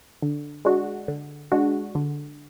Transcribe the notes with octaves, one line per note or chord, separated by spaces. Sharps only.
D3
G#3 D4 F#4
D3
G#3 D4 F#4
D3